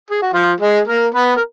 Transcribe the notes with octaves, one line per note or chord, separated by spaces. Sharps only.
G#4
F#4
F3 F4
G#3 G#4
A#3 A#4
B3 B4
A#4